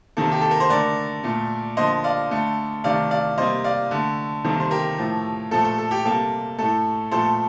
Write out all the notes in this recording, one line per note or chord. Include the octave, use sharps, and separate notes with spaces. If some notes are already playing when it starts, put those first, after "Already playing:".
C3 D#3 A#3 A4
G4
A4
A#4
C5
D3 A3 A#4 D5
A#2 A3
D3 F3 A#3 C5 D#5
D5 F5
D3 A3
C3 D#3 A3 D5 F5
D5 F5
C3 G3 A#3 C5 D#5
D5 F5
D3 A3
C3 D#3 G3 A#3 A4
C5
G4 A#4
A2 F3 A3
A#2 F3 A3 A4
A4
A4
G4
C3 G3 A#3 A4
A2 A3 A4
A#2 F3 A3 A4 C5